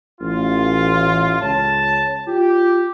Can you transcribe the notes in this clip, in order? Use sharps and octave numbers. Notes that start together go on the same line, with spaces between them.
A1 F4
C#2 C#5 A5
F4 G4